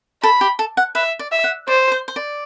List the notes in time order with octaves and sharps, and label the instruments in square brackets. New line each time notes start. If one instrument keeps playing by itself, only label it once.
[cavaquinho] A4 [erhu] B5
[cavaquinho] G4
A4
F#5
[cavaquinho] B4 [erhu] E5
[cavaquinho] D5
[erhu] E5
[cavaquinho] F#5
[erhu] C5 [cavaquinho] D5
[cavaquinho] C5
C5
D5